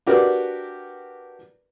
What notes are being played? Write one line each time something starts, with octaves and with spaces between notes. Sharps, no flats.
D4 F#4 G4 A#4 B4 D5